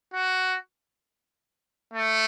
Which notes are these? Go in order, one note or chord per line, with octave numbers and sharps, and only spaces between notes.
F#4
A3